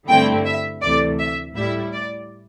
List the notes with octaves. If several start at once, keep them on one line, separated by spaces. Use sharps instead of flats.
G2 D3 A3 C4 E4 G5
E5
D2 C3 E3 A3 D5
E5
A2 G3 E4 E5
D5